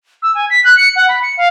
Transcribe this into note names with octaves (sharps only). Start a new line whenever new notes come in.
E6
G#5
B6
F#6
C#7
F#5
B5
C#7
F5